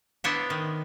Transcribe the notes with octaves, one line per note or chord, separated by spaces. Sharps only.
B3 D4 E4 C5 C#5 E5
D#3